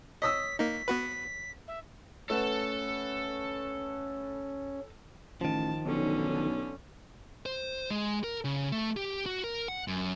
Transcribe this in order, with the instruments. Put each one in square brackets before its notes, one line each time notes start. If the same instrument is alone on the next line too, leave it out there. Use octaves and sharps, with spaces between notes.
[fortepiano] C#5 D#6 E6 [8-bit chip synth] D#5 [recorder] B6
[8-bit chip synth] A#3 D#4 [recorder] B6
[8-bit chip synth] B3 F#4 B4
[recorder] E5
[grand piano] A3 B4 F#5 [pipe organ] C#4 [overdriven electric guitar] A4 A5
[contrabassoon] A1 [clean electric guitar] D#3 F3 [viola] A5
[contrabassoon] B1 [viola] D3 C#4
[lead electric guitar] C5
G#3
A#4
C#3
A3
G4
F#4
A#4
F#5
F#2